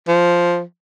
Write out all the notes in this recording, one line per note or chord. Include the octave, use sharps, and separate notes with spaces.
F3